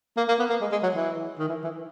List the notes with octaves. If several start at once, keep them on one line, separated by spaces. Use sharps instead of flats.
A#3
A#3
B3
A#3
G#3
G#3
F#3
E3
D#3
E3
E3